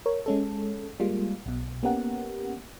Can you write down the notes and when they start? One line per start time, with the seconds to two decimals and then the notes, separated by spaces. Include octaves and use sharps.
0.06 A#4 C#5
0.26 G#3 C#4 A4
1.00 G3 G#3 A#3 F4
1.46 B1 B2
1.83 A#3 B3 C#4 G4 A#4 F#5